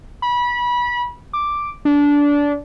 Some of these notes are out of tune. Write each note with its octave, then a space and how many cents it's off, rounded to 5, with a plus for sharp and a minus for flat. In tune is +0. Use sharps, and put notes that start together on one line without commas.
B5 -25
D6 +0
D4 -20